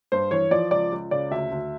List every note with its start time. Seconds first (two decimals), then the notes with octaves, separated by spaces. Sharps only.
0.12 G2 C5
0.31 E3 C#5
0.51 F3 D5
0.71 C#2 D5
0.92 C#2
1.11 C#3 D5
1.31 D2 E5
1.51 D2